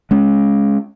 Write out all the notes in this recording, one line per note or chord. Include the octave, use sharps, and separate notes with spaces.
G#3 C#4